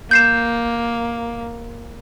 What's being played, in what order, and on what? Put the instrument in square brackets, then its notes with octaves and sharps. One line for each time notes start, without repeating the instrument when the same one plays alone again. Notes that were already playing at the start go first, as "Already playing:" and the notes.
[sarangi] A#3 [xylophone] G6 C7 E7